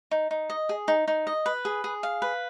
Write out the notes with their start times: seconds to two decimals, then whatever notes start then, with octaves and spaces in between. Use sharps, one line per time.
0.11 D#4
0.31 D#4
0.50 D#5
0.69 G#4
0.88 D#4
1.08 D#4
1.27 D#5
1.46 B4
1.65 G#4
1.84 G#4
2.03 F5
2.22 B4